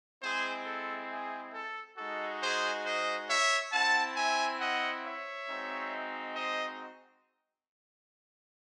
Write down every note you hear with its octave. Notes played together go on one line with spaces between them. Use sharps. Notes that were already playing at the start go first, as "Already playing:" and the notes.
G#3 C4 E4 G#4 C5
A4
G#4
A4
G#3 D#4 F#4 A4
G#4 C5
C5 D#5
C#5 E5
C4 E4 F#5 A5
E5 G#5
D#5 F#5
C#5 E5
G#3 C4 D#4 F#4
C5 D#5